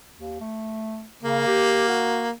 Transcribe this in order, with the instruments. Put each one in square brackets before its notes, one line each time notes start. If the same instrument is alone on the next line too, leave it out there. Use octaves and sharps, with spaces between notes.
[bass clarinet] D#2
A3
[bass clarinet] C#3 [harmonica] A#3
[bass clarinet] G4
F#4